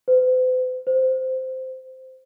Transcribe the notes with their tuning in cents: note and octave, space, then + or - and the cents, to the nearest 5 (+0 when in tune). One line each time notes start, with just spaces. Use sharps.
C5 -45
C5 -10